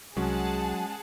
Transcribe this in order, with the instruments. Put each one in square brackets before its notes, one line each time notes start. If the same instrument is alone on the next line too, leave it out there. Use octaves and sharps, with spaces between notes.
[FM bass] C2 [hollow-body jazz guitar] F#3 [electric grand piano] G#3 C#4 [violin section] G#4 F#5 A5